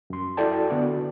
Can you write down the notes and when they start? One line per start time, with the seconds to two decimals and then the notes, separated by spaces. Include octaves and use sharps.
0.10 F#2 C6
0.37 E4 F#4 A4 D5 G5 A5
0.70 D3 B3 F#4 D5